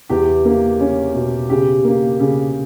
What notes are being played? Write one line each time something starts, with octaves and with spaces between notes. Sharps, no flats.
E2 G4
A#3
C#4
B2
C#3 G4
A#3
C#3